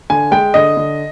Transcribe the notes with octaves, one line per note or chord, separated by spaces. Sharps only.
D3 G#5
G#3 G5
D3 D#5
D3